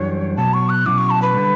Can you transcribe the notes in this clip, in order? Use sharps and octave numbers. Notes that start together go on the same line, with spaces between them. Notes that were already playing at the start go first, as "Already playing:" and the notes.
Already playing: F#2 E3 G3 D4 C#5
B2 F#3 B3 A5
C#6
F#6
B2 F#3 C#4 E4 D6
C#6
A5
B4
D3 G3